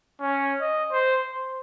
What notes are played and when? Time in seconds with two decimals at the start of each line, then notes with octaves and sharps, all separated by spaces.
0.21 C#4
0.61 D#5
0.92 C5
1.31 C5